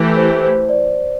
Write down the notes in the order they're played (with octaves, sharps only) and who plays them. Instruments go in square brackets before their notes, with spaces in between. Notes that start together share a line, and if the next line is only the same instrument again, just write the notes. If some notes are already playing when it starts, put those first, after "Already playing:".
Already playing: [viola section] E3 A3 E4 G4
[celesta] C5
C5
D5